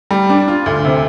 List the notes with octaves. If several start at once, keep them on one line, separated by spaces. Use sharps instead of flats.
G3
D4
F4
D2
C3